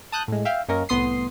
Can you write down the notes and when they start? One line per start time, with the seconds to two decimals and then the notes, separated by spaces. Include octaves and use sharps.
0.12 A5 D#6 F#6 G6
0.28 A2 G#3
0.45 E5 F5 G5
0.68 F#2 A#3 C#4 A#4 D#5
0.89 C2 A2 B3 C6 D#6 C7